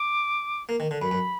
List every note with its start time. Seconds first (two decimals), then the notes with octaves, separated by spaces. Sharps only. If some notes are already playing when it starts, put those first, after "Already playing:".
Already playing: D6
0.69 A#3
0.80 D#3
0.91 D3
1.01 F#2 B5
1.11 F#2